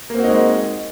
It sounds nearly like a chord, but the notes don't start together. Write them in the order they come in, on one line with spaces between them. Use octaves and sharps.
A#3 C4 F#4 D#4 G#3